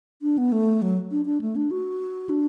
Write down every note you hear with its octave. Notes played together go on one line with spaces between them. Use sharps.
D4
B3
A3
F#3
D4
D4
A3
D4
F#4
D4